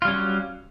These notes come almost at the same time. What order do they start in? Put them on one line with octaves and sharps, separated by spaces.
F4 G3 C#4 F#3